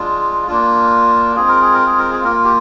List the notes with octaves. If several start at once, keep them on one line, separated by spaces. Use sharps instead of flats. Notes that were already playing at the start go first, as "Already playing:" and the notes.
Already playing: G#3 D4 F4
A#3 D4 F4
G#3 C4 F4 G#4
A#4
G#4
A#4
G#4
A#4
G#4
A#3 F4 A#4
G4